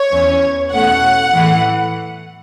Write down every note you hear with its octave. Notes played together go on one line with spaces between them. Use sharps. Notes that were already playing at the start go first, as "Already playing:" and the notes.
Already playing: C#5
E2 E3 C#4
E2 B2 A3 C#4 F#5
A2 E3 A3